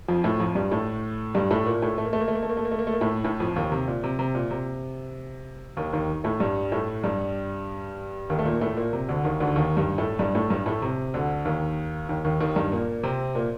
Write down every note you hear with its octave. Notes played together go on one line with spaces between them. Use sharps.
F2 F3
A2 A3
F2 F3
G2 G3
A2 A3
G2 G3
A2 A3
A#2 A#3
A2 A3
A3
A#3
A3
A#3
A3
A#3
A3
A#3
A3
A#3
A3
A#3
A3
A#3
A2 A3
A2 A3
F2 F3
D#2 D#3
C3
A#2
C3
C3
A#2
C3
D#2 D#3
D#2 D#3
A2 A3
G2 G3
A2 A3
G2 G3
D#2 D#3
A3
A#2 A#3
A2 A3
A#2 A#3
C3
D2 D3
D#2 D#3
D2 D3
D#2 D#3
G2 G3
A2 A3
G2 G3
A2 A3
G2 G3
A2 A3
C3
D2 D3
D#2 D#3
D#2 D#3
D#2 D#3
D#2 D#3
G2 G3
A#2 A#3
C3 C4
A#2 A#3